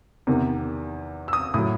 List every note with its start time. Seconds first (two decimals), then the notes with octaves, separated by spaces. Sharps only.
0.27 E2 C3 D#3
1.28 E6
1.33 D#6
1.54 A2 F#3 D#6